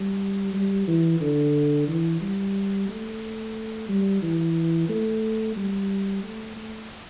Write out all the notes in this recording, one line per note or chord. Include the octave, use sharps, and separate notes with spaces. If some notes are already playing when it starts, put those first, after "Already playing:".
Already playing: G3
G3
E3
D3
E3
G3
A3
G3
E3
A3
G3
A3
A3